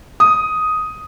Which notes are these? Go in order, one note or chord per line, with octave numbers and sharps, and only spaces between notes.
D#6